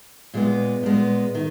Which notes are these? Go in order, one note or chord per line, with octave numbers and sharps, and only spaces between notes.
A#2 G#3 B3
A#2 G#3 B3
D#3